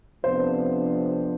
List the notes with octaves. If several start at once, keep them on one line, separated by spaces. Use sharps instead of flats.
F2 C3 F3 B3 D4 C5